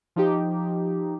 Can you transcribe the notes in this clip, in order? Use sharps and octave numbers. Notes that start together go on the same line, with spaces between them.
F3 D#4 G4